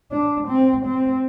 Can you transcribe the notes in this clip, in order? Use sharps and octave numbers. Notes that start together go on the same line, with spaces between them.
D4
C4
C4